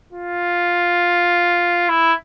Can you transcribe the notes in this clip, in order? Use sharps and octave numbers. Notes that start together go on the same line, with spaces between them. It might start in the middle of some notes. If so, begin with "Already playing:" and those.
F4
E4